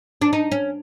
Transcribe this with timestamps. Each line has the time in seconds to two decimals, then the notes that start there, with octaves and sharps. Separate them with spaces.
0.22 D4
0.33 D#4
0.52 C#4